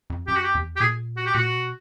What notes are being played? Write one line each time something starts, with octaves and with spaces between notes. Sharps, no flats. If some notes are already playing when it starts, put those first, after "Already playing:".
F2
F#2 G4
F#4
G4
E2
G4
A#2 G#4
F#4
G4
A#2 F#4
B2